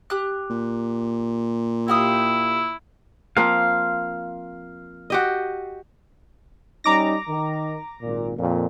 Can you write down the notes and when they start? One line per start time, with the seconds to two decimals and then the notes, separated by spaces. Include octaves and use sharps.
0.10 G4 F#6
0.50 A#2
1.88 E4 G4 F5 D#6
3.37 F3 A#3 C4 F5
5.10 F#4 G4 D#5
6.84 G3 C#4 D#4 A#5 D6 A#6
7.28 D#3
8.02 G#1 A#2
8.37 F2 A#2